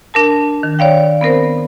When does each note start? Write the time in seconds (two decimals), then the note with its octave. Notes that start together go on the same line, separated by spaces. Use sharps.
0.14 D4 A#4 A5
0.63 D#3
0.79 C#5 D5 F5 G5
1.21 B3 C4 A#4 C5